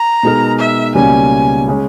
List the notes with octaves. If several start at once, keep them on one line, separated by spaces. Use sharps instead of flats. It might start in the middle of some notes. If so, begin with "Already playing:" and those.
Already playing: A#5
B2 G#3 D#4 A#4
E5
C#2 B2 G3 A#3 C#4 G#5
C#3 G#3 C#4